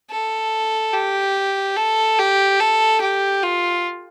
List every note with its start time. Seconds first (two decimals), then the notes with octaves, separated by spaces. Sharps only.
0.10 A4
0.94 G4
1.76 A4
2.18 G4
2.60 A4
3.01 G4
3.43 F4